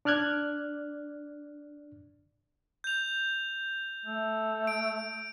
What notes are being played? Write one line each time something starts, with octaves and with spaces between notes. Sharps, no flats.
D4 D5 F6 F#6 G#6
G6 F7
A3
D7